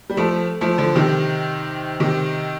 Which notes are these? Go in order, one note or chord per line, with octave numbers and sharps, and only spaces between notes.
G3
F3 A3
F3 A3
D3 F3
C3 D#3
C3 D#3